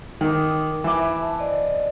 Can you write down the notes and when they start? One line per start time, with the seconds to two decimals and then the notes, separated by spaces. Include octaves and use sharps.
0.21 D#3 D#4 D6
0.84 E3 E5 B5 D6
1.22 A5
1.39 C5 D5 D#5